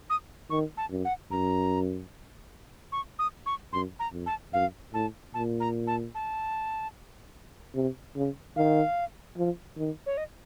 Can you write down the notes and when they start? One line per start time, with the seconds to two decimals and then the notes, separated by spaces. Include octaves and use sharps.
0.10 D#6
0.50 D#3 C#6
0.77 A5
0.90 F#2
1.05 F#5
1.31 F#2 A#5
2.92 C#6
3.19 D#6
3.46 C#6
3.73 F#2 C6
4.00 A#5
4.13 F2
4.26 A5
4.53 F#2 F5
4.94 A2 A5
5.34 A#2 A5
5.60 A#5
5.87 A5
6.15 A5
7.75 C3
8.16 C#3
8.56 D#3 F5
9.37 F3
9.77 D#3
10.06 C#5
10.17 D#5